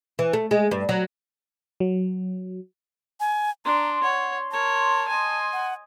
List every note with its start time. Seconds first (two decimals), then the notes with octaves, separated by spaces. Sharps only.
0.19 E3
0.33 A3
0.51 G#3
0.71 G2
0.89 F#3
1.80 F#3
3.20 G#5
3.65 D4 A#5 C6
4.03 C#5 F#5
4.51 A#4 C#5 A5
5.09 D#5 G#5
5.53 F#5